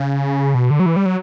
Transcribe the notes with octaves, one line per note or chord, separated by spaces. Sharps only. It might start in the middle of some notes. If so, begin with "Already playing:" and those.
Already playing: C#3
B2
D3
F#3
E3
G3
F#3